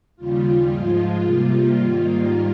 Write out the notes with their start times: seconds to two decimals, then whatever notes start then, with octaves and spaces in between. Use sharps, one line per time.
0.16 D#2 C#3 G3 F4
0.69 G#2 F3 G#3
1.20 C3 G3 A#3
1.73 G#2 D#3 G3 A#3